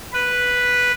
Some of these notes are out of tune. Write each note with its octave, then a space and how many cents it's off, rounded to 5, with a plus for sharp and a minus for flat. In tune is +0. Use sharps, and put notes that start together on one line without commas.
B4 -5